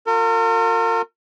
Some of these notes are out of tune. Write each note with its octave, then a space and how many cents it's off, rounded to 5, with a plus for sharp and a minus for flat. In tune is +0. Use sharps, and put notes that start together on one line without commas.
F4 +35 A#4 -40